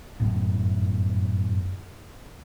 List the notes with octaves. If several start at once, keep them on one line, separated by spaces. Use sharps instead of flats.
G1 F#2 A2